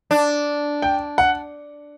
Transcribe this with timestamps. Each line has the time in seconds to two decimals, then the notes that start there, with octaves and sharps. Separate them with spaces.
0.11 D4
0.82 G5
1.18 F#5